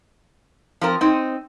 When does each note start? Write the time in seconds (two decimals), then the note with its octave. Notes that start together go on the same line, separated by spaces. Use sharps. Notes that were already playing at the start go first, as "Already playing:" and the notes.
0.81 F3 C4 A#4
1.01 C4 D#4